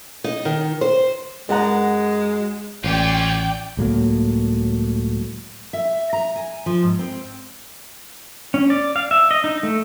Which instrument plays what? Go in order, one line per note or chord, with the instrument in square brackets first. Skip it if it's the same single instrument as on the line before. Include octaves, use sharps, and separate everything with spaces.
[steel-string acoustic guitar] D#4
D#3
C5
[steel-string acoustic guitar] F#2 F#5 A#5 [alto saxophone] G#3
[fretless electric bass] A1 [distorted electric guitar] C#4 F4 [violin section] D5 G5 G6
[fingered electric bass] C#2 A2 F#3 A#3
[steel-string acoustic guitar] E5
A#5
G#5
F3
G#2
C4
[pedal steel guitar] C#4
D5
F5
E5
D#5
D#4
A3